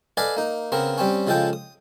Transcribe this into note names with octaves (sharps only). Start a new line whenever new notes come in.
A4 B4 D5 D#5 F5 G#5
A#3 D#4
C#3 B3 C4 A#4
G3 C4 C#4
C#3 F3 G#3 A4 G5 D#6
D#6